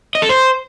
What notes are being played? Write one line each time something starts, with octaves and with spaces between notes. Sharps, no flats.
D#5
A4
C5